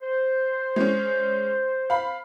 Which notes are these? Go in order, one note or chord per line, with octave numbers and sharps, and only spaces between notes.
C5
G#3 C#4
F5 B5